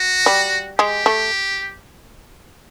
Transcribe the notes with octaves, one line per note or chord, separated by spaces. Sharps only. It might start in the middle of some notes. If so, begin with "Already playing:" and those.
Already playing: F#4
G3
G#3 G4
A3